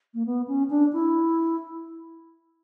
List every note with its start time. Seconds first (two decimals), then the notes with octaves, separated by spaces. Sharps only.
0.14 A#3
0.26 B3
0.47 C#4
0.70 D4
0.93 E4